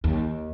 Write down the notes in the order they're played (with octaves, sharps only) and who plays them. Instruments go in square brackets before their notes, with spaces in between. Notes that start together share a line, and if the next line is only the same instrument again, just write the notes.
[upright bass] D#2